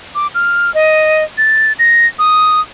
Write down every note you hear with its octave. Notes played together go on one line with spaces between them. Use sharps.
D6
F6
D#5
A6
A#6
D#6